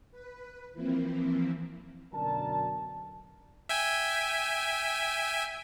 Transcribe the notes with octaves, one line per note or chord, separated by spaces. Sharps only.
B4
E3 F3 A#3 C4 E4
F#2 B2 D3 A#4 D5 A5
E5 G5 G#5